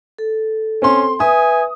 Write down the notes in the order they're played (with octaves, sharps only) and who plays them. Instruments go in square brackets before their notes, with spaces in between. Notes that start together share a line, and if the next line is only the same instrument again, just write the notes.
[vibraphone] A4
[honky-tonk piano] C4 C6 [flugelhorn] C#4
[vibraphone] B4 E5 [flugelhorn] G#5 [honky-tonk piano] D#6